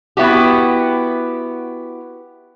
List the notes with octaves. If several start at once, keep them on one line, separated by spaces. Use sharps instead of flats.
B3 E4 F#4 G4